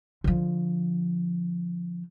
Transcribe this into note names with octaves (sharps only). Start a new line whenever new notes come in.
D3 F3